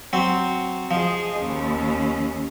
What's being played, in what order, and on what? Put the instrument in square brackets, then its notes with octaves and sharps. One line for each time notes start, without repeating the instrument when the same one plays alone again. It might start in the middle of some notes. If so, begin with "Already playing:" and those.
[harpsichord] F#3 C4
[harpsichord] F3 [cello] G#4 D#5
[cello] D#2 C#4